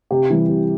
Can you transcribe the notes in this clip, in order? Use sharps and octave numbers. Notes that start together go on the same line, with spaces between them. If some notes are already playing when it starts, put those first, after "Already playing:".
C3 G4
E3 G3
C3